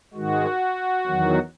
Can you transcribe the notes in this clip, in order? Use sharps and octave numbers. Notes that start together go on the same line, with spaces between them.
G#2 D#3 G#3 F#4
E2 D#3 F#3